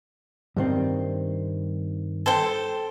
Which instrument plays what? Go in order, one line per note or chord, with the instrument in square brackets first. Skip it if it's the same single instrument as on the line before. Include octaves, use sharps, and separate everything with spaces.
[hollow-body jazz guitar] G2 D#3 C4
[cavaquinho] A4 C5 G5